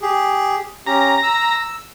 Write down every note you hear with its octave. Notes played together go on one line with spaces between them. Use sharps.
G4 G#4
C#4 G4 A#5
E6